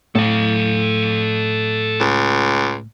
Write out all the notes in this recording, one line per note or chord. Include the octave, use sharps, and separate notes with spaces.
A2 A4 F5
C#2